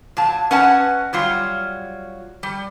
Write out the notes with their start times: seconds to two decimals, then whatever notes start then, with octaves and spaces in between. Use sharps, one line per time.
0.17 A#2 F#3 A5
0.51 C#4 B4 D#5 F#5 G#5 A5
1.13 F#3 G3 F4
2.43 G3